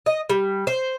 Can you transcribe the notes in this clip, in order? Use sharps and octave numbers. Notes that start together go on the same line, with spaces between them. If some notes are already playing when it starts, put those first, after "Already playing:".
D#5
G3
C5